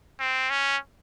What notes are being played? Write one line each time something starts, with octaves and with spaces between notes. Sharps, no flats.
C4
C#4